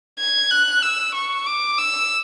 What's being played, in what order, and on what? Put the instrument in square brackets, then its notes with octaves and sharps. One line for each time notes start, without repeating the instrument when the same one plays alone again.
[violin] G#6
F#6
E6
C#6
D6
E6